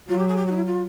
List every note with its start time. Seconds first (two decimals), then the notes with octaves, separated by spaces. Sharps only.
0.08 F#3 F4
0.18 G4
0.27 G#4
0.36 G4
0.46 F#4
0.51 D#4
0.55 E4
0.65 F4